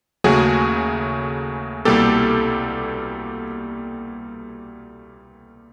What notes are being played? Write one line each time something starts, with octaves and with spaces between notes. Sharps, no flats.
D#2 C#3 F#3 A3 F#4 G#4
C2 B2 G3 A#3 G4 A4